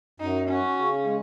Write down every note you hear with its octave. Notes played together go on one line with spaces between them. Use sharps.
F#2 D#4
C#4 F#4
C#3
G#3